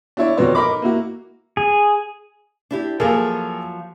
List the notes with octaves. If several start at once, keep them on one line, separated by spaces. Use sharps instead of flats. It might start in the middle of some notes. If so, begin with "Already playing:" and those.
D4 E4 C#5 D5
F2 B2 D#3 B3 C#5 D5
D#4 A#4 D#5 B5 D6
A#3 E4 F#4
G#4
D4 E4 G4
F3 F#3 A#3 G#4 A4